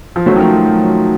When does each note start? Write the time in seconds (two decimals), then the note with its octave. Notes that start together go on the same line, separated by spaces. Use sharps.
0.16 F3
0.26 F#3 A3 C#4 F#4 C5
0.36 D#3
0.40 F3
0.54 F#3
0.69 F#3
0.82 F#3